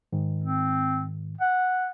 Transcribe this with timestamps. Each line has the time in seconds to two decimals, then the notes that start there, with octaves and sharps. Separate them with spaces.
0.13 G#2 D#3
0.44 C4
1.41 F#5